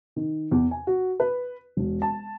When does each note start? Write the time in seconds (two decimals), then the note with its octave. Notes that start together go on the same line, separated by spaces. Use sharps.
0.16 D#3
0.51 E2
0.71 G#5
0.87 F#4
1.20 B4
1.77 E1
2.02 A5